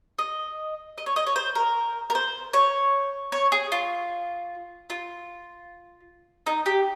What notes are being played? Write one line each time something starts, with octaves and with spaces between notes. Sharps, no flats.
D#5
D#5
C#5
D#5
C#5
C5
A#4
A#4
C5
C#5
C#5
G#4
F4
F4
D#4
G4